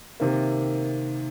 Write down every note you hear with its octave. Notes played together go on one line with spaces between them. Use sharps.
C3 D#3 A#3